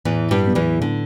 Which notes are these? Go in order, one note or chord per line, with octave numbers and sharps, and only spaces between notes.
E2 A2 E3
G2 G3
F#3 B3
E2 E3
A2 D3